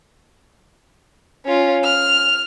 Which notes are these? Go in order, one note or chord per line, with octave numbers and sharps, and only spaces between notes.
C#4 F4
F6